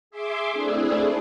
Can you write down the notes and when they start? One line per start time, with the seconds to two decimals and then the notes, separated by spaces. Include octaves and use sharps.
0.11 G#4 E5 C6 D6
0.51 A3 C4 D4 E4 G#4